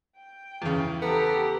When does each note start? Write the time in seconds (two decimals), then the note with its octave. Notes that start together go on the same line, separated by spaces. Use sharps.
0.17 G5
0.62 E2 C#3
1.02 B3 G4 A4 A#5